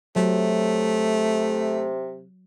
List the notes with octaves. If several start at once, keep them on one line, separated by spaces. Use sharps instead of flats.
C3 F#3 A3